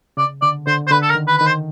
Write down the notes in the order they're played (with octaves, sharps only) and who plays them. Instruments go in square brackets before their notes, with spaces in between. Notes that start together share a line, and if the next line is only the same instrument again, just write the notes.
[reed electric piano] C#3 [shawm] D5
[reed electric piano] D3 [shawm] D5
[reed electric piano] D3 [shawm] C5
[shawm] C5
[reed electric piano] D3 [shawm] B4
[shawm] A4
A#4
[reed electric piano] D#3
[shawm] B4
[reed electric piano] D#3 [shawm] B4
[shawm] C5